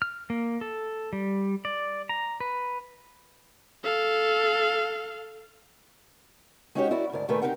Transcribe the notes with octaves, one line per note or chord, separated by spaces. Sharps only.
F6
A#3
A4
G3
D5
A#5
B4
A4 F5
G#3 C#4 D#4 F#4 G4 C#5
E4 F#4 A#4 D5
D2 G#2 A#4 D5
A#2 D#3 A3 A#4 B4 G#5
C4 D4 D#4 G4 A#4 F#5